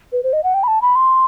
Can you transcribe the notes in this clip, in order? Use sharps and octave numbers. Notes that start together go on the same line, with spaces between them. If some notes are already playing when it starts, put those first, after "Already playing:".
B4
C5
D#5
F#5
G5
B5
A5
B5
C6